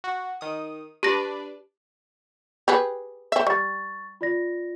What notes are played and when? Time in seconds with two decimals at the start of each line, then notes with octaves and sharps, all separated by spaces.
0.04 F#4
0.41 D#3 D#6
1.03 D4 G4 B4 D5 A#6
2.68 G4 G#4 B4
3.32 C4 E5
3.47 G3 C#6 A6
4.21 F4 D5 A#6